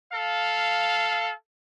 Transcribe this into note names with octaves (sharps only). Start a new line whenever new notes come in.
A4 F5